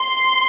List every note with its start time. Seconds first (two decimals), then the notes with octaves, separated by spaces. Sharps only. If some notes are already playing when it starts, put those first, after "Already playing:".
Already playing: C6